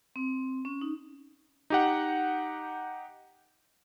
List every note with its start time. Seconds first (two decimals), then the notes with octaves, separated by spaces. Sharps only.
0.16 C4
0.65 C#4
0.81 D#4
1.70 D#4 G4 F#5